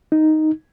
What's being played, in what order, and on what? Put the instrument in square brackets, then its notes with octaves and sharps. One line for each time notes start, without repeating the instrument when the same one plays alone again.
[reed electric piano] D#4